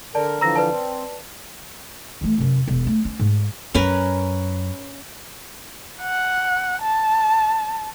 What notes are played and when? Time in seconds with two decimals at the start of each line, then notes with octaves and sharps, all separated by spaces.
0.15 D3 A#4 D5 A5
0.41 D3 E3 F3 A#5 E6 A#6
0.56 B4 D5 A5
0.71 C4
2.21 E3 A3
2.38 F#2 C3
2.68 E1
2.87 A3
3.05 C#4
3.19 G#2
3.74 F#2 C#4 A#4 B4
6.01 F#5
6.82 A5